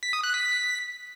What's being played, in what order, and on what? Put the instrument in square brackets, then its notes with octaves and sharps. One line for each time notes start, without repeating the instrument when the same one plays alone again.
[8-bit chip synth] B6
D#6
F#6
B6